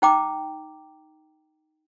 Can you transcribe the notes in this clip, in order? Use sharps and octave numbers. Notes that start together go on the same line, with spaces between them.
D#4 C5 G5 A#5 D6